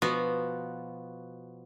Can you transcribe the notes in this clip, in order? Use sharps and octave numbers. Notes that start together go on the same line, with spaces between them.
B2 F3 B3 F#4